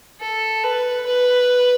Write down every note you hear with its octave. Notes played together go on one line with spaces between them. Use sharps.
A4
B4
B4